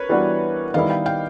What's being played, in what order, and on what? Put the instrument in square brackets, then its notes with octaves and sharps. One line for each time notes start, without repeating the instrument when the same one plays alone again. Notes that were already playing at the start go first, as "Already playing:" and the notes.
Already playing: [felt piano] A#4 B4 C#5
[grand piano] E3 G3 B3 D4 F#4
[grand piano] D#3 G3 B3 E4 [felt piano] D#5 F5
[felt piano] F5 G5
F5 G5